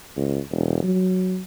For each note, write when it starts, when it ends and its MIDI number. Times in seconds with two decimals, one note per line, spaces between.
0.17 0.39 37
0.51 0.82 28
0.84 1.40 54